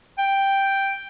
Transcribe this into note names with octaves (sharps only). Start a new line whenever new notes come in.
G5